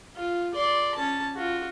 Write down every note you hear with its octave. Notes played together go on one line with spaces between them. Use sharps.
F4
D5 C6
C#4 A5
F4 F#4